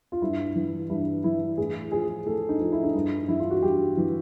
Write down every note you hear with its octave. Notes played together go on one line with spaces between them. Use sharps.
F4
G2 E4
E3
G2 E4
E3 E4
A2 G#4
F3 G#4
A2 A4
D#4
F3
E4
D#4
G2 E4
E3 E4
F4
F#4
G2 G4
E3